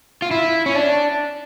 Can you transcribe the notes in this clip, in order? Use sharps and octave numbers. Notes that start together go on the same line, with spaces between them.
F4
E4
C#4
D4